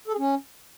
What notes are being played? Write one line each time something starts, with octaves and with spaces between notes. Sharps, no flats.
A4
G#4
C#4